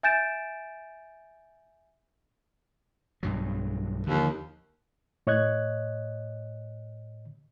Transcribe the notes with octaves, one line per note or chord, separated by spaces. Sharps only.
E5 G#5 G6 A6 D7 E7
B1 G2 F#3
D#2 D3 E3 F3
A2 C#5 D#5 F#6 G#6